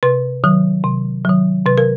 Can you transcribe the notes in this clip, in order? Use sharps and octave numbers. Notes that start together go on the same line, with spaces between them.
C3 B4
D#3 F#3
C3
D#3 F#3
C3 B4
A#4